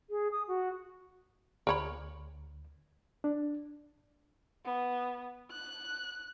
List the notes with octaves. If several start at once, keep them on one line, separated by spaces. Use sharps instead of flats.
G#4
D#6
F#4
D2 A#4 C#5 B5
D4
B3
F#6